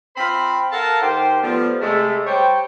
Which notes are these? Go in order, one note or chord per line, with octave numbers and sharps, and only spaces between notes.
C4 F4 C5 B5
A4 A#4 F5 F#5 A5
D#3 G4 C5 G5 C6
F3 G3 A3 B3 F4
C3 G#3 A3
G3 C5 C#5 G5